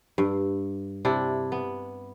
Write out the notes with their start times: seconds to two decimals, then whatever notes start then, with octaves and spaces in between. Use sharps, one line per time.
0.18 G2
1.05 C3 D4 E4
1.52 B3